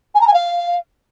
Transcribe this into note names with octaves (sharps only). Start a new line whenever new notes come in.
G#5
A#5
G#5
F5